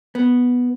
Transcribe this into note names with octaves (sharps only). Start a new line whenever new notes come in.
B3